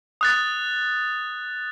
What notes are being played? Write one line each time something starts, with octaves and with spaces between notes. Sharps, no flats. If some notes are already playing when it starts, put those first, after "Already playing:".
D#6 F#6 A6